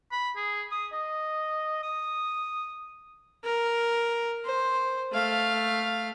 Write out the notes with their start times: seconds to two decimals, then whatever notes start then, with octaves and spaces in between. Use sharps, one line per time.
0.12 B5
0.36 G#4
0.71 D#6
0.93 D#5
1.83 D#6
3.44 A#4
4.45 C5
5.12 A3 F5